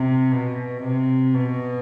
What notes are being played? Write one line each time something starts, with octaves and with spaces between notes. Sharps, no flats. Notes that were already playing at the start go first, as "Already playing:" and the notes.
Already playing: C3
B2
C3
B2